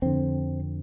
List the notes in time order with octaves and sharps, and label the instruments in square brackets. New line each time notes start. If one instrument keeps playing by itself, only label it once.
[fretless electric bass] F2 D3 C4